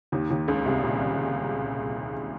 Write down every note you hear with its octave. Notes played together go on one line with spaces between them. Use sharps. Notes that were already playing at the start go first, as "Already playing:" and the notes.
D#2 D#3
D#2 D#3
C#2 C#3
C2 C3
A#2